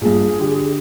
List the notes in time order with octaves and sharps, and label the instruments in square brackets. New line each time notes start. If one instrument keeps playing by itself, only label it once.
[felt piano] A#1 G2 [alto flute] G#4
[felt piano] D3 G4